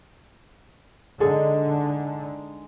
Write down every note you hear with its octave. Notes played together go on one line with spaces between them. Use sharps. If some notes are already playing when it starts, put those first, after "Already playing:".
D3 G#3 D#4 G#4 A4